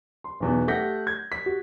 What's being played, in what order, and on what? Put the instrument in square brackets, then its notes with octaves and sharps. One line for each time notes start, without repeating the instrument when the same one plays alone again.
[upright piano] C6
B1 E2 B2
A3 G4 F#5 G6 A#6 B6
G#6
B6
F#4